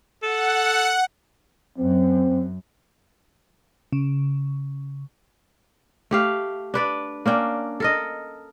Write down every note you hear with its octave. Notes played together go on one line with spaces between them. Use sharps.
A4 F#5
F#2 C4
C#3
A3 G4 F5
D4 B4 D5
A#3 C#4 D4 G5
A4 A#4 D#5